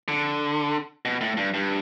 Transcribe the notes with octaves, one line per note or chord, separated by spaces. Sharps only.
D3
B2
A2
G2
G2